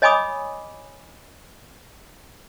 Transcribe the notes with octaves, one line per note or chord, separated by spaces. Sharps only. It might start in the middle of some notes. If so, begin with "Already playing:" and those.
C#5 D#5 G#5 B5 D6 D#6